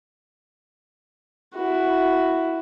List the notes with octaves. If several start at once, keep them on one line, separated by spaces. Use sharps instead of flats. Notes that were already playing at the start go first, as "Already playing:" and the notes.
E4 F#4